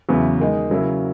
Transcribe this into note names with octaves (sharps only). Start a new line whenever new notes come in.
E2 C#3 F#3 B3 E4
D#3 G#3 D#4
C#3 F#3 A#3 E4